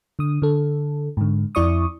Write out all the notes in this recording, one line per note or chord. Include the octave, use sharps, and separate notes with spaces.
D3 D#6
D3 A4
G#2 D3
F2 E4 D5 C#6 D#6